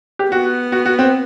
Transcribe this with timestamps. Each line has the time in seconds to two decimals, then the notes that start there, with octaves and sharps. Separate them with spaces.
0.19 G4
0.32 B3 F#4
0.72 F#4
0.86 F#4
0.99 C4